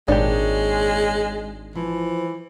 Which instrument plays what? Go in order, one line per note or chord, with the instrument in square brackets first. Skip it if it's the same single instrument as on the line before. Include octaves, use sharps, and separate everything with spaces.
[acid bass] G#1 [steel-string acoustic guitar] A#2 C#5 [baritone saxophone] G#3 [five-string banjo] D4 G4
[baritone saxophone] E3 [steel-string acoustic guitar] F3